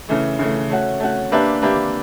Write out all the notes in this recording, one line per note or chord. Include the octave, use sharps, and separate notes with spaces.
C#3 E3 A3
C#3 E3 A3
A3 C#4 F#4
A3 C#4 F#4
A#3 D4 G4 B4 E5
A#3 D4 G4 B4 E5